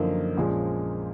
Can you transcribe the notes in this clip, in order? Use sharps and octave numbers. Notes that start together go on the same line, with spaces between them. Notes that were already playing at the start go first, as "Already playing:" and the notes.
Already playing: F#2 D3 F3 A#3 D#4
A#1 A#2 F3 G#3 C#4